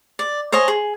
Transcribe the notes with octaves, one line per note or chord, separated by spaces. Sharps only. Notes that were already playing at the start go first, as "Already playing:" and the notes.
D5
C5 C#5 D#5 G#5
G#4